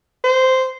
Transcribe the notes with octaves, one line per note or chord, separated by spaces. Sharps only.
C5